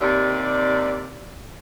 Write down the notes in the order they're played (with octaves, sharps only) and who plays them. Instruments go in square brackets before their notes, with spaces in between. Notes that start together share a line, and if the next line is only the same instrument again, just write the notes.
[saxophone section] D#2 C3 D5